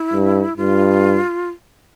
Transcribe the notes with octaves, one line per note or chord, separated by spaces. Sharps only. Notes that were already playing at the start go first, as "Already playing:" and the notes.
Already playing: E4
G2
G2 F4